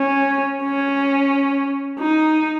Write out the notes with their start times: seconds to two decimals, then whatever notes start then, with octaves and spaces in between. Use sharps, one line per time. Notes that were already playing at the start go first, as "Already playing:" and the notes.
Already playing: C#4
0.63 C#4
1.99 D#4